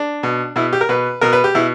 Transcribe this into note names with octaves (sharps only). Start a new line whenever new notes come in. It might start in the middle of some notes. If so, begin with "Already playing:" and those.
Already playing: D4
B2
B2 E4
G4
A#4
B2 B4
B2 A#4
B4
G4
B2 E4